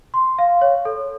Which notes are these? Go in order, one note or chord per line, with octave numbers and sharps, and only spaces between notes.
C6
F5
C#5
A4